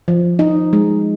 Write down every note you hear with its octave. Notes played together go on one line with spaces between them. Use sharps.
F3
D#4
G#3